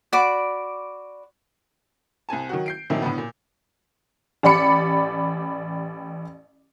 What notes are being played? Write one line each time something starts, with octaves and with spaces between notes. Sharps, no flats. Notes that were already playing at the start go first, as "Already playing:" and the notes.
F#4 D5 B5 D6
C2 C4 G#5 A5
D#3 F#3 F#4
G6 C7 D7
F2 A#2 D#3 F#3 D#4 E4
A2 D3 B3
A#2
A1 G4 D5 B5 C#7